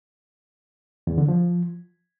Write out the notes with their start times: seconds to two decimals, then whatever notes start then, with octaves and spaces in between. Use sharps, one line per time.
1.07 E2
1.18 D3
1.28 F3